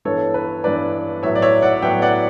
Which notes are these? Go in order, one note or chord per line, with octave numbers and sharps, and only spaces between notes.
G2 E3 B3 A4 C#5
B4
G2 E3 B3 B4 D5
A2 F#3 B3 E4 C#5 E5
D5
C#5 E5
D5 F#5
A2 F#3 B3 E4 E5 G5
D5 F#5